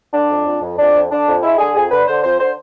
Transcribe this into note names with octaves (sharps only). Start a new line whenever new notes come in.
D3 D4
F2
F2
F2
F2 D4
F2
D3 D4
F2
G#3 E4
D3 G#4
F2 G#4
D3 B4
D3 C5
F2 C5
D3 C5